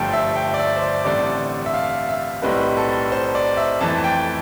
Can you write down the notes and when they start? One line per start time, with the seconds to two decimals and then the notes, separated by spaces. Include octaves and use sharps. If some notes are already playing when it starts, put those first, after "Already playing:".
Already playing: G1 G2 F3 A3 G5 A5
0.13 E5
0.36 G5
0.54 D5
0.59 E5
0.76 C5
0.83 D5
1.05 A1 G2 D3 A3 C4 D5
1.66 E5
1.74 F5
2.09 E5
2.42 B1 A2 G3 C4 B4
2.77 A4
3.12 C5
3.35 D5
3.57 E5
3.80 F2 E3 A3 A5
3.98 A5
4.04 G5